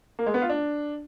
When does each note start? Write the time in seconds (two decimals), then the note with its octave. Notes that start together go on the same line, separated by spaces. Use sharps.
0.19 A#3
0.26 G#3
0.34 B3
0.42 F4
0.50 D4